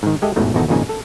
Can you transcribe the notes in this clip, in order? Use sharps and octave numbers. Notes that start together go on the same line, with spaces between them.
G#2 D#3
G#3 G4 A4 D#5 E5
A1 E2 G#2 B2 A3
G#1 E2 B2 D#4 F#4 A4
G#1 F2 A#2 C#3 D#4 G#5
A4